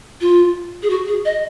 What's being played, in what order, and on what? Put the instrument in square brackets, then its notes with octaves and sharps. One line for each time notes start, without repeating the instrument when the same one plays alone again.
[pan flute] F4
G#4
F#4
G#4
D#5